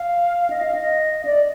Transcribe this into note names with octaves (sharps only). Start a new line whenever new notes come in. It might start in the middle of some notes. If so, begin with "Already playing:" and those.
Already playing: F5
D#5
F5
D#5
D5